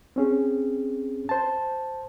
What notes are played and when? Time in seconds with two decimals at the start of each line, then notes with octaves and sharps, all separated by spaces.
0.16 C4 C#4 G#4
1.29 C5 A5